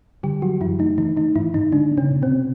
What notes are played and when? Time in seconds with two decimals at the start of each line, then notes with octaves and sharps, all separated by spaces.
0.23 D3 G3 G4
0.42 F3 F#3 F#4
0.61 F#2 E3 E4
0.79 D#3 A3 D#4
0.98 D#3 E3 D#4
1.17 D#3 A3 D#4
1.35 G#2 E3 E4
1.54 G#2 D#3 D#4
1.72 D3 G#3 D4
1.91 B3
1.98 C#3 C#4
2.10 B2
2.22 C3 C4
2.29 B2